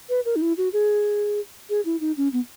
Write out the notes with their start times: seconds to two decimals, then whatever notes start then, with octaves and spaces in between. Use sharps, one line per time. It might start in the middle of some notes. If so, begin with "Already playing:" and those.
0.09 B4
0.25 A#4
0.36 D#4
0.42 E4
0.57 F#4
0.73 G#4
1.70 G#4
1.85 E4
2.01 D#4
2.17 C#4
2.33 B3